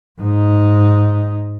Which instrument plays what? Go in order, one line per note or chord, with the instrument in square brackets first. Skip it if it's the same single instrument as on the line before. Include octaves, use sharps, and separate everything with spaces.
[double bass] G#2 D#4